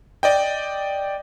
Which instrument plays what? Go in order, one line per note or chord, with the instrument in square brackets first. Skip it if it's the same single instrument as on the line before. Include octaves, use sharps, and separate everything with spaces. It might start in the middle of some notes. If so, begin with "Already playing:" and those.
[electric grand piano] D5 D#5 G5